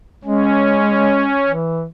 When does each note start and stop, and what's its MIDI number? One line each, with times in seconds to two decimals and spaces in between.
0.24 1.33 56
0.24 1.51 61
1.47 1.86 52